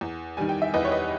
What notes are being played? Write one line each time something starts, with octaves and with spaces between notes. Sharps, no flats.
E2
D#3 G3 G#5
G5
E5
E2 B4 D#5
C#5
B4 D#5